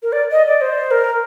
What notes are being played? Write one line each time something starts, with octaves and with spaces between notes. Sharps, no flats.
A#4
D5
D#5
D5
C5
A#4